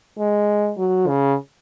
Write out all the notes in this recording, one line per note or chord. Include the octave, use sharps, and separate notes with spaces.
G#3
F#3
C#3